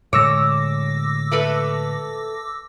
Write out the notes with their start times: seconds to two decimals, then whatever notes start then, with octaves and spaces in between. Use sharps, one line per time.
0.13 A2 D3 G#3 C#5 D6 E6 A#6
1.32 A3 A4 B4